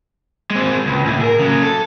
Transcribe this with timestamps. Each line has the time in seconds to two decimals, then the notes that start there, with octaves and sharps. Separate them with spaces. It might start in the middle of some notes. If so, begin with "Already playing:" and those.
0.51 G#3 C4
0.87 C#2
1.05 C#2 A2
1.21 G#4 A#4
1.39 C#3 F#3
1.63 A4